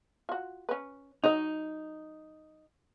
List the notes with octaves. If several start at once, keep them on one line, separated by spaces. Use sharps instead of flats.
F4 F#4
C#4 B4
F#3 D#4 C#5 D#5